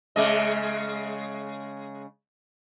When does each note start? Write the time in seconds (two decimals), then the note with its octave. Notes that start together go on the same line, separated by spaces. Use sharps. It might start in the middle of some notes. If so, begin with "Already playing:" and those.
0.16 C#3 G#3 D#5